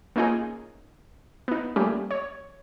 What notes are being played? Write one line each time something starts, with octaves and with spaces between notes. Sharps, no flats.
A#3 C#4 D#4 F4 G#4
B3 D#4
F3 G3 A3 A#3 C#4 G4
C#5